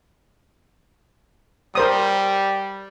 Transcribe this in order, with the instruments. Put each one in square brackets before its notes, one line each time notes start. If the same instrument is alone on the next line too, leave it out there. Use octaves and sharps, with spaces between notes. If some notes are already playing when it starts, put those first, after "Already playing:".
[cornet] G3 [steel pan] A#4 C5 D#6